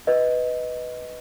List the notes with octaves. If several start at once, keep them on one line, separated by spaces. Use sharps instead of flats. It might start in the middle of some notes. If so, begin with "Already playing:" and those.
B4 D#5